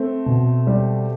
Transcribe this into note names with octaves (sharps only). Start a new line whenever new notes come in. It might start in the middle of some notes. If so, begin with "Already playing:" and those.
Already playing: A3 C4
B2
G3